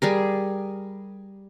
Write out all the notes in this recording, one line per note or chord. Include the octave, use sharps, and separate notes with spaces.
G3 G#4 A#4